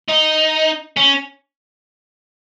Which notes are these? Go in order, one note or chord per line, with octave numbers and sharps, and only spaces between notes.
D#4
C#4